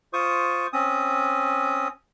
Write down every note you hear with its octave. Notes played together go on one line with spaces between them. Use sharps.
F4 C5 C#6 D#6
C4 C#4 D#6